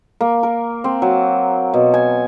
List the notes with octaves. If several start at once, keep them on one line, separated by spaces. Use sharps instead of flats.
A#3
A#4
C4
F#3
B2
G#5